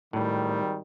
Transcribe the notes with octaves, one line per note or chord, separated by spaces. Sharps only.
G#1 A2 D#3 G3